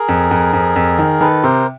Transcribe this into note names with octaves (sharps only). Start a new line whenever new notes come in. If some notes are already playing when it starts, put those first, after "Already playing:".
Already playing: G#4 A#4
F2
F2
F2
F2
D#3
D#3 A4 B4
C3 A#4 C5